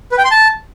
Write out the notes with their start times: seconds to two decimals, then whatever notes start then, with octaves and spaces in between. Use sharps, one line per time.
0.12 B4
0.18 G5
0.25 C6
0.31 A5